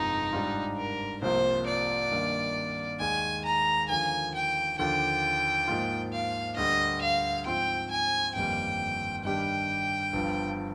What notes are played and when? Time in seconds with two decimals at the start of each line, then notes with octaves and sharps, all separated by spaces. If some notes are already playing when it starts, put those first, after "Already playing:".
Already playing: G1 F2 C3 F3 G#3 D#4
0.33 G#2 G3 D4 F4
0.76 A#4
1.21 C2 C3 F3 A#3 C5
1.67 D5
2.11 G2 D#3 A#3
3.00 D#2 D#3 G#3 G#5
3.45 A#5
3.89 D#2 D3 F3 G#5
4.35 G5
4.78 D#2 D3 F3 G5
5.68 G#2 F3 A#3 F4
6.13 F5
6.56 D2 D3 G3 D#5
7.02 F5
7.46 G#2 F3 C4 F4 G5
7.91 G#5
8.35 G1 F2 D#3 G3 A#3 G5
9.24 G2 D#3 G3 D4 G4 G5
10.13 G1 G2 F3